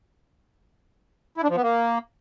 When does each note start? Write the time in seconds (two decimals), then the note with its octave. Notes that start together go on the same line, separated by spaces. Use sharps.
1.37 E4
1.43 D4
1.50 F3
1.56 B3
1.63 A#3